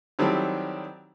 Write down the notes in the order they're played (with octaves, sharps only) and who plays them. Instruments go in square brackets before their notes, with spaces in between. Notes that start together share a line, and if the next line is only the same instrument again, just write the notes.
[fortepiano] D#3 F#3 G3 A3 C4 E4